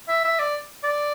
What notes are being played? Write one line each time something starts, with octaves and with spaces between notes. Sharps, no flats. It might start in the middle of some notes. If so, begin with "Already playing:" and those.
E5
E5
D5
D5